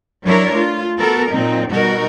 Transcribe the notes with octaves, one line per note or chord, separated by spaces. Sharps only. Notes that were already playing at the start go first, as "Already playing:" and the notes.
F#3 D4 E4 A#4 C#5
A3 F4
B3 F#4 A4 A#4
A#2 F#3 C4 D#4
B2 G3 D#4 F#4 A#4